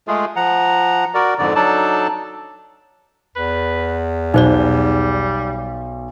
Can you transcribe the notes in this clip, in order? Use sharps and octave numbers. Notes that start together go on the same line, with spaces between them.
G#3 A3 F4 G#4
F3 F#5 A#5
F#4 A#4 D5
F2 G#2 D3 D5
F#3 D4 D#4 A4 D5 A5
E2 B4
B1 G3 D#4 C5 D5